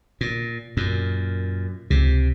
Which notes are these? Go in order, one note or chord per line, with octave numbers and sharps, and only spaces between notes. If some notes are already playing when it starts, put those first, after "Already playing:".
A#2
F#2 A#2
C#2 C3